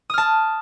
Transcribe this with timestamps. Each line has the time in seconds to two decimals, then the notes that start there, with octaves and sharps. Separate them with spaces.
0.10 D#6
0.14 F6
0.18 A5